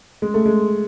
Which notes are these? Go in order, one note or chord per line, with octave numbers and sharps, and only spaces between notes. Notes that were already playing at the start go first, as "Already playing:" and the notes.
G#3
A3
G#3